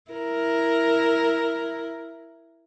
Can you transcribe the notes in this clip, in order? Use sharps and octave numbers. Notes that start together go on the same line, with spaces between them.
E4 A#4